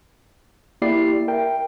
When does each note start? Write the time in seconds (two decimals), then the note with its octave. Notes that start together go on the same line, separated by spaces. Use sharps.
0.82 A#3 E4 G4 D5 C7
1.28 A#4 E5 G5